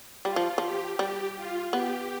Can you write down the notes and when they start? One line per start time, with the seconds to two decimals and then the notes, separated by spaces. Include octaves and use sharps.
0.25 G3 F4
0.36 F3
0.58 F3 G4
0.99 G3 G4
1.36 F4
1.73 B3 G4